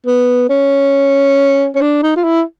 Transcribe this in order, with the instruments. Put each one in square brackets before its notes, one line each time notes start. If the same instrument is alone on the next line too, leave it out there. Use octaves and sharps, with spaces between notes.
[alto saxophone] B3
C#4
C#4
D4
D#4
F4
E4